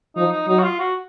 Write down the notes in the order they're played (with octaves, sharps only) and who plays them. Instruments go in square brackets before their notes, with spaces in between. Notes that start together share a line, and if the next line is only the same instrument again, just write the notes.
[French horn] F3 [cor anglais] D#4
[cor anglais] D#4
[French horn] F#3 [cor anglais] D#4
[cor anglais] F#4
F4
F#4